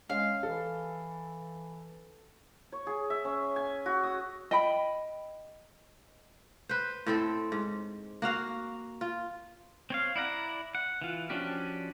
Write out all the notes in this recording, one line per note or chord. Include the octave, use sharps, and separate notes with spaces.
G#3 C#4 F5
E3 A4
C#5
G#4
E5
C#4
G#5
F#4
D#6
D#5 G5 B5
B4 C5
A2 C4 A4
G#2
A#3 F#4 F5
F4
C4 C#5 F5
E4 D5 F#5 A#5
F#5
E3 F4
F3 C#4 D4 F#4 G4